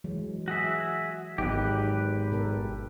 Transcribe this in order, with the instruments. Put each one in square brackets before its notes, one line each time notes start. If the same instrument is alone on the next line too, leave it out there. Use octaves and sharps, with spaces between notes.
[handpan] E3 F#3 G#3
[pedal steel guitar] F#4 G#4 E5
[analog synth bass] G#1 [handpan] F#3 B3 D#4 [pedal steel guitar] G4 B4
[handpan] B2 A4 A#4